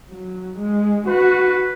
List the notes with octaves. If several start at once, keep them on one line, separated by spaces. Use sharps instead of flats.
F#3
G#3
F#4 B4